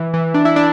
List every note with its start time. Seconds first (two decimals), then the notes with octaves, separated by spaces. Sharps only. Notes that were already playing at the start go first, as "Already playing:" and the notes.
Already playing: E3
0.14 E3
0.34 D4
0.45 E4
0.56 D4